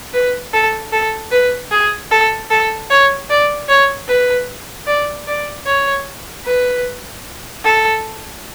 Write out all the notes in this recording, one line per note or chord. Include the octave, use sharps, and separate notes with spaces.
B4
A4
A4
B4
G#4
A4
A4
C#5
D5
C#5
B4
D5
D5
C#5
B4
A4